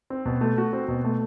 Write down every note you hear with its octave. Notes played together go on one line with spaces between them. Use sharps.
C4
B2
A3
F#4
C4
B2
A3